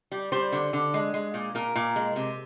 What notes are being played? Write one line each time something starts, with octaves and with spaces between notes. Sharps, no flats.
G3
G3 C5
D3
D3
G#3
G#3
A#2
A#2 A#4
A#2
G#3
C3